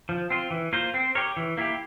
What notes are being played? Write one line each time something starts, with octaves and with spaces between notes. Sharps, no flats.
F3
C4 F4
E3
A#3 F4 C5
C4
G4 A#4 C#5
E3
A#3 E4 G4